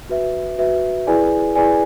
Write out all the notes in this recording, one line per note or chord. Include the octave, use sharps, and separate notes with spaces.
F#4 B4 E5
F#4 B4 E5
E4 G#4 B4 D5 G#5
E4 G#4 B4 D5 G#5